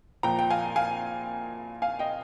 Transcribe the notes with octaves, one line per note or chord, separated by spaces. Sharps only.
A#2 F3 G5 A#5
G5
F5 G#5
F5 G#5
F5 G#5
D#5 G5